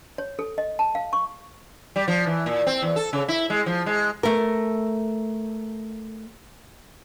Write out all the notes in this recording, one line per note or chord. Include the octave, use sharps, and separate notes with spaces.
C#5
A4
D#5
A5
F5
C#6
G3
F3
E3
A#2
C4
E2
A4
C#3
E4
G#3
F3
G#3
A3 A#4